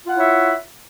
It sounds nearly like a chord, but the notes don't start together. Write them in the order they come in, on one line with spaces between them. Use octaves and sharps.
F4 F#5 E4 C#5 E5